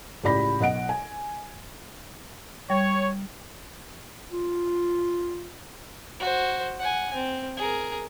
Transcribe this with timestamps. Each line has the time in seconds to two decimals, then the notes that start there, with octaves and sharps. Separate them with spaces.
0.24 C#2 A2 G4 D5 B5 A#6
0.60 B1 D#5 F#5 D7
0.89 G#5
2.70 G3 C#5
4.31 F4
6.20 F#4 C5
6.79 F#5 G#5
7.14 C4
7.57 G#4 A#4